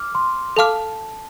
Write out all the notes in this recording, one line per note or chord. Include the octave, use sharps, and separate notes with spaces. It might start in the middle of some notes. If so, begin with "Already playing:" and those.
Already playing: D6 F6
C6
A4 F5 A5 D6 F6